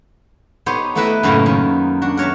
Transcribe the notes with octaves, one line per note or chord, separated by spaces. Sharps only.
B3 D#4 G4 C5 C#5
A3 B3 E4 B4 D#5 E5
F#2 A2 C#3 A#3 B3 D#4
D#3
D4 F#4
A#4 C#5 E5 A5